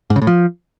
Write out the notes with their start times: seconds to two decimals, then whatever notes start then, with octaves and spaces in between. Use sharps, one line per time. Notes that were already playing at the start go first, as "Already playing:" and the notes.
0.10 G#2
0.16 C#3
0.22 A2
0.27 F3